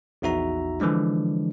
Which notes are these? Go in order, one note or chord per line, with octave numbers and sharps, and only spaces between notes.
A#1 E2 D#4 F#4 E5 A#5
D3 E3 F3 G#3 D4